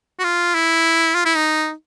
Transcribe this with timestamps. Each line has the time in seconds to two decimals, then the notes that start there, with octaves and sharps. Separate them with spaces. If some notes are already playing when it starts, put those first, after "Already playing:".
0.19 F#4
0.24 F4
0.55 E4
1.15 F4
1.25 E4
1.36 D#4